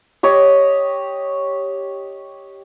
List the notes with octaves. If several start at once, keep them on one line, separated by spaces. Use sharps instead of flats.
G4 C#5 D#5